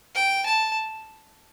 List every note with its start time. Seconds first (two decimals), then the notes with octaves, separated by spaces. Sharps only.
0.15 G5
0.46 A5